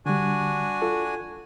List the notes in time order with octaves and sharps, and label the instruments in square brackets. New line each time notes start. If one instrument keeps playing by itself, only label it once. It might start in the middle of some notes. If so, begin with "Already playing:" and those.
[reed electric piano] D3 G3 [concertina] D4 F#4 G#5
[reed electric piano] F4 A4